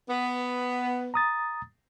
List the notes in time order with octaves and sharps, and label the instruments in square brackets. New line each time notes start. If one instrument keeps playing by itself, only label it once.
[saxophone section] B3
[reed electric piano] A#5 D#6 A6